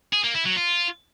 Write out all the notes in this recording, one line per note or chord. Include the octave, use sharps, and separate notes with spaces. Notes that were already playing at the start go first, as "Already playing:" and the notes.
G#4
A#3
E4
F#3
F4